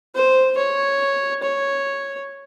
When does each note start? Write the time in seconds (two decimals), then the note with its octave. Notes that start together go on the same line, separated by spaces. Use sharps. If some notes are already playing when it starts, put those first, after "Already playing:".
0.15 C5
0.58 C#5
1.43 C#5